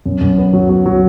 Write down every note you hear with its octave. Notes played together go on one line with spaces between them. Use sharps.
F#2
F#2
B3
F#3
F#3
F#3